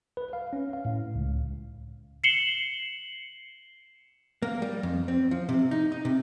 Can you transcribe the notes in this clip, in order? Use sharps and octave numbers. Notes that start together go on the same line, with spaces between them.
B4
F5
C#4
F5
A2
C#2
C7 C#7 E7 F#7 G7
A#3
G3
F2
C4
F3
C3
D#4
D#4
C3